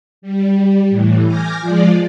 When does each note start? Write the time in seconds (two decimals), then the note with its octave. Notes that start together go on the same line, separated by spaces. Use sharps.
0.22 G3
0.90 A2 E3
1.24 G#5 D6 F6 G6 A#6
1.60 F3 G#3 F4 D5